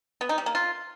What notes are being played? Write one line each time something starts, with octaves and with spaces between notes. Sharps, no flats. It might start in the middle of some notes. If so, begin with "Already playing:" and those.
B3
D#4
G3
A#3
F4